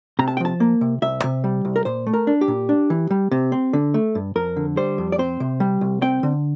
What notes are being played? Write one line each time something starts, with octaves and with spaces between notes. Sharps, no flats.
C3 A#5
A5
G5
F3 A5
A#3
C3
C2 E5
C3
G3
C2
A#4
A#2 C5
A3
A#4
D4
G4
A#2
D4
E3
G3
C3
C4
D3
A3
G2
F2 A#4
D3
G3 C5
F2
D5
C4 C5
C3
G3
C2
C4 G5
D3